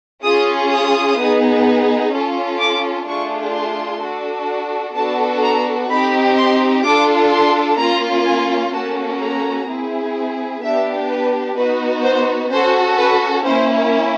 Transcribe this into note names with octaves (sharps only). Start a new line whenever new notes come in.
C#4 F4 G#4 D#6
D#6
B3 D#4 G#4
C#4 F4 A4
D6
A3 D4 F4 G#4 C#6
C6
D4 F#4 A4
B3 D4 F#4 A4 A5
A#5
C4 D#4 G4 B5
C6
D4 F4 A4 D6
C6
A#3 C#4 F4 A#5
G#5
A#3 C#4 F#4 A4 A5
A#5
C4 E4 G#4
B3 D4 G4 E5
B4
B3 D#4 F#4 B4
C5
C#4 F#4 A4 C5
B4
A#3 C#4 E4 C5